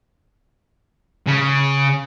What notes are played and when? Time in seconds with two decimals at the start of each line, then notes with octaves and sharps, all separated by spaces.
1.27 C#3